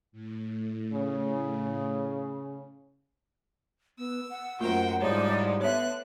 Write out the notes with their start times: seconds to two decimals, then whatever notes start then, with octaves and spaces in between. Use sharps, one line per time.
0.12 A2
0.92 C#3
3.98 B3 E6
4.30 F#5
4.60 F#2 A3 A#3 F4 A#4 C5 G5
5.01 G#2 F3 G3 D#4 E4 C#5 D5
5.61 D3 B3 C#5 E5 F#6